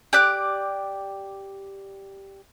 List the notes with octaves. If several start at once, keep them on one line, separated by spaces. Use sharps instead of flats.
G4 D5 F#6